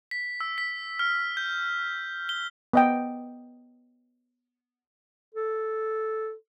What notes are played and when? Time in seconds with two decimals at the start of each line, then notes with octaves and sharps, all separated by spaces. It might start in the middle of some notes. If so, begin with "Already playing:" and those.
0.11 B6
0.41 E6
0.58 B6
0.99 F6
1.37 G6
2.29 G7
2.73 B3 D#5 G5
5.35 A4